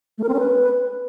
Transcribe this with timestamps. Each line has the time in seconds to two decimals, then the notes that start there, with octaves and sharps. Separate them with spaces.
0.18 A3
0.23 A#4
0.29 C4
0.34 C#4
0.39 B4